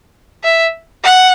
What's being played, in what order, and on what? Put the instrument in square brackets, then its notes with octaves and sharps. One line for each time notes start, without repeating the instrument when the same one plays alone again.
[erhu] E5
F#5